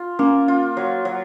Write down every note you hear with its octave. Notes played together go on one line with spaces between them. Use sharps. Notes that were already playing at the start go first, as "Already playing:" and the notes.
Already playing: F4
A#3 C#4
F4
F#3
F#3